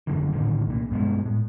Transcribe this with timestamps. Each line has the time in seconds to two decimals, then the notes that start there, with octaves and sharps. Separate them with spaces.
0.07 G#1 F#2 D3 E3
0.32 A#1 A2 D3 D#3
0.67 C2 A#2
0.91 G2 B2 G3 G#3
1.25 A2